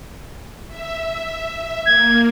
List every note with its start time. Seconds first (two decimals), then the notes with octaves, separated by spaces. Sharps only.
0.69 E5
1.86 A#3 G#6